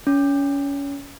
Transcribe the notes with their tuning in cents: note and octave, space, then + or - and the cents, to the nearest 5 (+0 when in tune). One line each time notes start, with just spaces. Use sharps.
C#4 +25